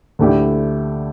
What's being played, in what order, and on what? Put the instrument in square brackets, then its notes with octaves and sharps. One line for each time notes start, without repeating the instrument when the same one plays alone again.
[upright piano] D2 D3 A3 E4 G4